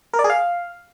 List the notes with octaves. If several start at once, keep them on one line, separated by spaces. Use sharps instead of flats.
A#4
D5
G#4
F5